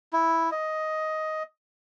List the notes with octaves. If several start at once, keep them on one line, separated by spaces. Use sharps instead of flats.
E4
D#5